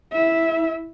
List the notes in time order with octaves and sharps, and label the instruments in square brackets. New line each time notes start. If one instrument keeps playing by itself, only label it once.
[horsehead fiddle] E4 E5